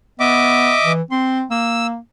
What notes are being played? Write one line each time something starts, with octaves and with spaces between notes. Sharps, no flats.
B3 D#5 E5 D6
E3
C4 C6
A#3 E6